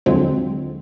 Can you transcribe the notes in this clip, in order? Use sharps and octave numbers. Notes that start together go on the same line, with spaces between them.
D#2 D3 F3 F#3 G#3 C4